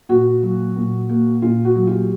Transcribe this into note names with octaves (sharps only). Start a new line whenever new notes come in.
A#2 F#4
F#3
A#2
A#3
A#2 F4
F#4
F#3
F4 G4